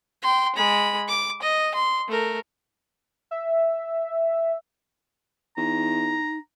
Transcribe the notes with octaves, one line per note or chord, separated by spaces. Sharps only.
G5 C6
G#3 B5
D6
D#5
C6
A3 A#4
E5
E2 D#4 A#5